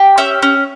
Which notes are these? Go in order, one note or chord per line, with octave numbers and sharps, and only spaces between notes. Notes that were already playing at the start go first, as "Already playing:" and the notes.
Already playing: G4
C#4 E5
C#4